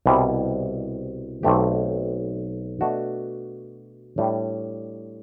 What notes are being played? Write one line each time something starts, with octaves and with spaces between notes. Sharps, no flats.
C2 B2 G3 C4 E4
B1 B2 A3 C4 G4
B2 A3 D4 F#4
A2 G3 D4